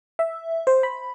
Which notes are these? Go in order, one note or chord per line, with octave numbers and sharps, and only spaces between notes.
E5
C5
B5